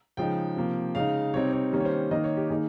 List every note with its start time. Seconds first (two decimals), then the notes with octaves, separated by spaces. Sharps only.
0.17 C#3 F3 G#3 D#4 G5
0.56 C3 F3 A#3
0.95 C#3 G#3 D#4 F5
1.33 C3 G3 C4 D#4 C#5
1.53 C#5
1.72 D#3 G3 A#3 C#4
1.80 C#5
1.85 C5
2.11 D#3 A#3 D#4 D#5
2.24 C#5
2.37 G4
2.50 D#3 A#3 D#4 G#4